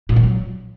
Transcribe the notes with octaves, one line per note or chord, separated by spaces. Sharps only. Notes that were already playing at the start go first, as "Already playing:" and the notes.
A#2
E3
F#3